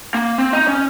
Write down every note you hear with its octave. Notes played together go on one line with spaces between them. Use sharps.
A#3
C4
D#4
C#4